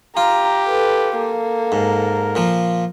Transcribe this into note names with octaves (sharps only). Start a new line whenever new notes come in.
F4 G4 A#5
A4 B4
A#3 A4
G#2 A#4
A#2 F3